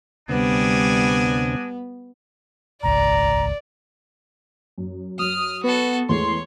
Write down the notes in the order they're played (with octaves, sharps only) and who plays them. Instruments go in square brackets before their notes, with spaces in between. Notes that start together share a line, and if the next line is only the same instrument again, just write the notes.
[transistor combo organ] D2 C3 [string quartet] G3 [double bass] B3 [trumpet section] D4 D#5 G#5
[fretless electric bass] D#1 G#1 C#2 [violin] D5 [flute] A#5
[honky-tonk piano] F#2
[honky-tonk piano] F#3 [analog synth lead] D#6 [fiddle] F6
[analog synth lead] B3 [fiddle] F#4 A4
[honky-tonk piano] E2 G#3 A3 [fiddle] C#5 [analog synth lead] C6